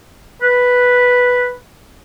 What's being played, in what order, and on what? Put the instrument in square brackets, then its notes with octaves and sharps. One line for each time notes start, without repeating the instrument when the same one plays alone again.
[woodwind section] B4